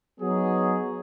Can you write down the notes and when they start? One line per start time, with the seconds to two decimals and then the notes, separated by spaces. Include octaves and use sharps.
0.19 F#3 B3 D#4 G#4 C#5